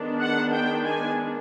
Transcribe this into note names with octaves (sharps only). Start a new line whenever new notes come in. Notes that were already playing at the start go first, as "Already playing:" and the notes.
Already playing: D#3 G#3 B3 D4
F#5
G5
G#5